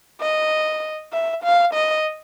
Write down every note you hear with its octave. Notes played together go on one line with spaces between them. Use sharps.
D#5
E5
F5
D#5